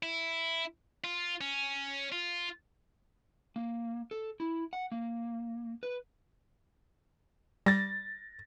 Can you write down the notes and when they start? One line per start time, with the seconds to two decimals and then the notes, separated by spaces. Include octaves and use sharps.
0.03 E4
1.04 F4
1.41 C#4
2.12 F4
3.56 A#3
4.11 A4
4.40 E4
4.73 F#5
4.92 A#3
5.83 B4
7.66 G3 A6 A#6